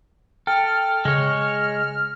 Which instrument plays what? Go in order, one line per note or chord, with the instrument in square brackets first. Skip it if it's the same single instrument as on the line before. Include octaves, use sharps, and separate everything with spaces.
[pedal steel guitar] A4 [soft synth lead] G5 [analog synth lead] F6
[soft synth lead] C#3 [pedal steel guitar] G#3 C#5